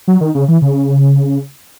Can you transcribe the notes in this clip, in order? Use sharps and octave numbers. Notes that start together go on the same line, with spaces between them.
F#3
D#3
C#3
E3
C#3